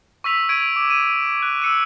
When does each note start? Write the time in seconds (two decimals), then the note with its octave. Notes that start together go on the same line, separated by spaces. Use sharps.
0.24 C#6 E6 B6 F7
0.49 C#6 G#6 D7 D#7
0.76 D6
0.90 D#7
1.42 F#6
1.62 E6 C#7 D#7